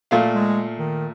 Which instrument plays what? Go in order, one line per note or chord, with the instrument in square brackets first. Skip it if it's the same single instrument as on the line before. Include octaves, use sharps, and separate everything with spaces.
[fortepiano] A#2 A3 F5
[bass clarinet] G#3
D#3